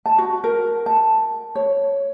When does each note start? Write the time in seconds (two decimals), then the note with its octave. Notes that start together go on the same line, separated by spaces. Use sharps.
0.06 A5
0.18 F#4
0.44 A#4
0.86 A5
1.55 C#5